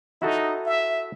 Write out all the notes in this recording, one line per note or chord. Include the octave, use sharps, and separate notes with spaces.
D#4 E4 F#4 A4
E5